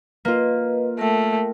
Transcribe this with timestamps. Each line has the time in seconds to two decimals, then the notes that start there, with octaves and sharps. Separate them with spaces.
0.25 A#3 F4 B4 D#5
0.99 A3 A#4 G5